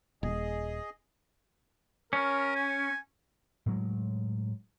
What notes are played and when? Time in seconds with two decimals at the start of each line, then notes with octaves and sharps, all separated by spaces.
0.23 D#1 G#4 D#5
2.13 C#4 A#4
2.56 G#5
3.66 A2 F#3 G#3